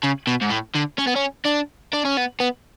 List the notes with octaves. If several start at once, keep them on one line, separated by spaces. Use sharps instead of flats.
C#3
B2
G#2
A2
D3
C#4
B3
C#4
D4
D4
C#4
B3
B3